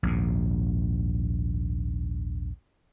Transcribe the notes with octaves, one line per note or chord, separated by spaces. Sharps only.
A#1 D#2 G#2